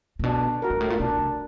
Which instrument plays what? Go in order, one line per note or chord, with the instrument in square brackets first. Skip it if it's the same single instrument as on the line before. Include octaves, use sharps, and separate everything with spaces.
[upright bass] A#2
[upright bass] B2 [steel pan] D4
[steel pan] F#4 A#4
[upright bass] G#2
A2
A#2
[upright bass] B2 [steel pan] D4
[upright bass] C3